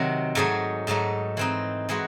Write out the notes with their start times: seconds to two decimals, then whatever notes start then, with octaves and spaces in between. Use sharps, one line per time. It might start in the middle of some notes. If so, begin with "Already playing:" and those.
Already playing: C3 D#3 F#3 C4
0.35 G#2 F#3 A3 D#4 G#4
0.87 G#2 F#3 A3 D#4
1.37 E3 C4 D#4
1.89 E3 G#3 D#4 F#4